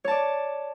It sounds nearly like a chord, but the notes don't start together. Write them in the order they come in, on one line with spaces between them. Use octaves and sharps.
C#5 A5 D5